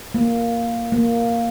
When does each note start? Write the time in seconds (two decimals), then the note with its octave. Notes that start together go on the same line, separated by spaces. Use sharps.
0.14 A#3
0.92 A#3